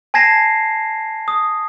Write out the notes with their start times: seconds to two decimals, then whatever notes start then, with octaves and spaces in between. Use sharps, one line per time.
0.14 G#5 A5 G#6 A#6 C7 E7
1.28 D#6